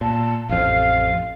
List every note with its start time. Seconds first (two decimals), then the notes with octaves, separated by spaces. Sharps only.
0.01 A#2 A5
0.49 A1 F2 F5